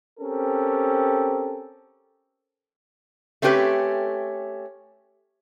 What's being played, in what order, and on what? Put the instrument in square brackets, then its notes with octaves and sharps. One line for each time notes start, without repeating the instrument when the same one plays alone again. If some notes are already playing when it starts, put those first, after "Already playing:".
[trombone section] C4 C#4 G4 A4 A#4
[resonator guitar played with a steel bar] A3 C4 C#4 G4 B4